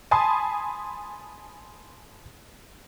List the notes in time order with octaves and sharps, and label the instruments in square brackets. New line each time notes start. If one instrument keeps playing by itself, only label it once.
[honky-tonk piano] G#5 A5 B5 C6 D#6